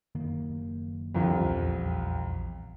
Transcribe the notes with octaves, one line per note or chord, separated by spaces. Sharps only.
F#1 D#3 A#3
C2 F2 D3
A#1 E2